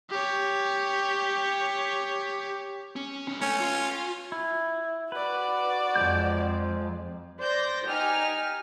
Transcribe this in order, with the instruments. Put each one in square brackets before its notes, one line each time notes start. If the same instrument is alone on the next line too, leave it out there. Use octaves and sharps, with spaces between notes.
[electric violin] G4 C#5
[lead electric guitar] C#4
C2 C#4
[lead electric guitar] A3 [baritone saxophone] C#4
[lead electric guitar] F4
[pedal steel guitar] E4
[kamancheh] F#4 D5 [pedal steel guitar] B4
[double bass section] F2 [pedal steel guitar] F3 G#3 G6
[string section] C5 D5 G6 A#6
D#4 G4 G#5 F6